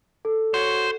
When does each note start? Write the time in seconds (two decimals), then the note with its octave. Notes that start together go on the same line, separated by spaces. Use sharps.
0.25 A4
0.54 F#4 C5 C#5